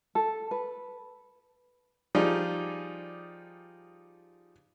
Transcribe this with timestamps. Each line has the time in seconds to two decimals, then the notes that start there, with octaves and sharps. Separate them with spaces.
0.15 A4
0.51 B4
2.15 F3 G3 D#4 G#4 D5